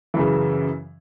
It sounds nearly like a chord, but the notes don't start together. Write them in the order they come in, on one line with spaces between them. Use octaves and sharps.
E3 F#2 C#3